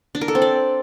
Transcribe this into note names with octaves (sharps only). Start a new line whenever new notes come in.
D4
A#4
A4
C4
D5